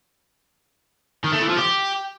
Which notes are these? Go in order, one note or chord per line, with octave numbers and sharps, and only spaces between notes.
D#3
A3
E3
F3
G4